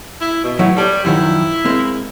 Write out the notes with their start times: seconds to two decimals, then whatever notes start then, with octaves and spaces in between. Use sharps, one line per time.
0.21 E4
0.44 B2
0.59 A2 F#3 E4
0.77 G3 A4 A#4 C#5
1.05 F#2 D#3 F3 E4
1.65 G#3 A#3 C4